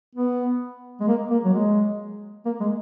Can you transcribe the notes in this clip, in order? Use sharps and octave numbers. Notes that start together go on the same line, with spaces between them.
B3
G#3
A#3
A#3
F#3
G#3
A#3
G#3